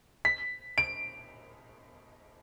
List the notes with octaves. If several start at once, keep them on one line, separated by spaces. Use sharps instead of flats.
B6
D7